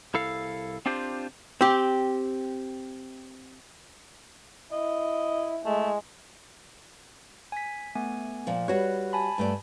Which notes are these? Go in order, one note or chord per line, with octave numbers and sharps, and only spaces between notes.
C2 E4 A4 F5
C4 D4 F4 G4 C5
C4 G4
E4 D#5
G#3 A3
G#5 B6
A3 B3 G#5
A#2 F3
G3 F#4 B4 C#5
G#5 A5 B5
G2 A3 D5